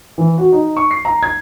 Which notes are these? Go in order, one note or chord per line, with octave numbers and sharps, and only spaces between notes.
E3
F#4
D#4
C#6
C7
A#5
G#6